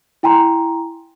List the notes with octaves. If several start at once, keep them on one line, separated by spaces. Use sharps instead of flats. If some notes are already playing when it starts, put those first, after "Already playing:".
E4 G5 G#5 A#5 C6